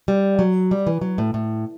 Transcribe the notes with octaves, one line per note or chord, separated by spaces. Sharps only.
G3
F#3
G3
E3
F#3
A2
A2